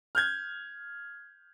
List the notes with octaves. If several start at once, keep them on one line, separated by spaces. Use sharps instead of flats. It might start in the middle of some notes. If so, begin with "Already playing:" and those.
F6 G6 G#6